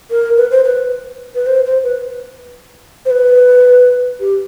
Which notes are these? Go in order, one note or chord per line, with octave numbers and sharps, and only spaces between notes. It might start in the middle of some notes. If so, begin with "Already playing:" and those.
A#4
B4
C5
B4
B4
C5
C5
B4
C5
B4
G4